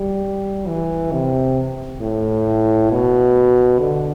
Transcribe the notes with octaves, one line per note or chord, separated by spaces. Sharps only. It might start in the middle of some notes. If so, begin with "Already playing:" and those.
Already playing: G3
E3
C3
A2
B2
D3